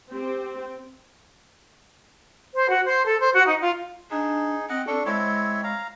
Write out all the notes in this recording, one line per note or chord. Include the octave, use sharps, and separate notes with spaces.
C4 G4
C5
F#4
C5
A4
C5
F#4
D#4
F4
D4 D#4 G#4
C4 D#5 F#5
D4 A4 C#6
G#3 C4 E4 C#5
F5 A#5